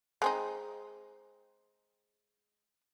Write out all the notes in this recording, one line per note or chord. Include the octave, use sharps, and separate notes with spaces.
G#3 C4 D#4